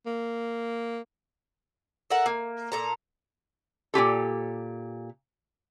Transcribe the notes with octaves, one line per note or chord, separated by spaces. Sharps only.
A#3
A4 A#4 E5 F#5
A#3
A#2 A4 A#5
A#2 F4 G4 A4